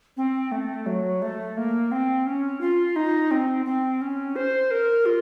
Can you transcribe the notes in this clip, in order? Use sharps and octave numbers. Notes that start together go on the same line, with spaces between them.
C4
A3
F#3
A3
A#3
C4
C#4
F4
D#4
C4
C4
C#4
C5
A#4
F4